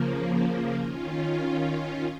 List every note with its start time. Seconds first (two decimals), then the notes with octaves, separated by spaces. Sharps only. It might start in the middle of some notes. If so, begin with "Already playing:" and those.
Already playing: C#3 F3 A#3
0.74 D#3 C#4 F4 A#4